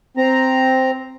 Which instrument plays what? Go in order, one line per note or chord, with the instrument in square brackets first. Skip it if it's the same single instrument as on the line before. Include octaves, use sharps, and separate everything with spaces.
[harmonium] C4 A#5